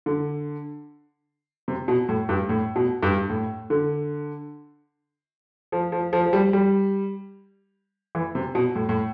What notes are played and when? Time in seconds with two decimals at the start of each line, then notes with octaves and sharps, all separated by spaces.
0.06 D3
1.68 C3
1.88 B2
2.09 A2
2.29 G2
2.49 A2
2.76 B2
3.03 G2
3.30 A2
3.70 D3
5.72 F3
5.92 F3
6.13 F3
6.26 F3
6.33 G3
6.53 G3
8.15 E3
8.35 C3
8.55 B2
8.75 A2
8.89 A2